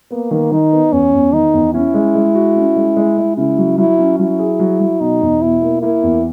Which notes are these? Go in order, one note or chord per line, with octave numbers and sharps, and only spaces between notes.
A#3 B3
D#3
D#3 D#4
B3
E2 C#4
E2
D#3 D#4
E2
C#4 E4
G#3
G#3
F#4
C#4
G#3
G#3
G#3
C#3 E4
F#3
F#3 E4
C#4
F#3 E4
G#4
F#3
F#3
B2 D#4
E2
B2 E4
A#3
A#3 E4
E2